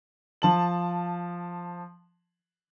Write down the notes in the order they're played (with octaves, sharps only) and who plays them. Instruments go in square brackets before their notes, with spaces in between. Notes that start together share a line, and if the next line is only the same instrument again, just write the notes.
[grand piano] F3 A5 F#7